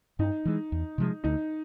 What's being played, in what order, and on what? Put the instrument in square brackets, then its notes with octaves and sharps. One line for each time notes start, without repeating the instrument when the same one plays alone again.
[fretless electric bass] G2 [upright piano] D#4
[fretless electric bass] E3 G#3
E2
C3 F3 G#3
[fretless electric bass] D2 [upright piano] D#4